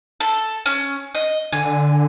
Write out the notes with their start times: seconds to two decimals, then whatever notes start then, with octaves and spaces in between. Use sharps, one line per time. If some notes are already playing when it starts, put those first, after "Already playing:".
0.20 A4
0.66 C#4
1.15 D#5
1.52 D3 G#5